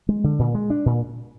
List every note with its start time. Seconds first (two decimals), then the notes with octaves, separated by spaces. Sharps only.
0.09 G#3
0.24 D3
0.39 A#2
0.55 G#3
0.70 D4
0.86 A#2